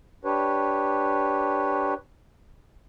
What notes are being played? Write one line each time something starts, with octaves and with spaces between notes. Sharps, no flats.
D4 G4 B4 C#5